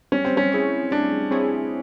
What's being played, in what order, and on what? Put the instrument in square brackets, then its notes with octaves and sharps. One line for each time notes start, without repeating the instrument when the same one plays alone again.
[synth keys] G3 [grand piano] C#4
[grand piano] C4
C#4
[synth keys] C4 E4 G#4 C#5
[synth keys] G3 [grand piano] D4
[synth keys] C4 E4 G#4 C#5